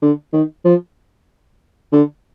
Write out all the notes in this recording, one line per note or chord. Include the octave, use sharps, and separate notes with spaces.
D3
D#3
F3
D3